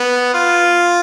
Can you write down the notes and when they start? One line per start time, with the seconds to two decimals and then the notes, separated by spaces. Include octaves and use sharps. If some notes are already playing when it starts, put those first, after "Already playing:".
Already playing: B3
0.34 F4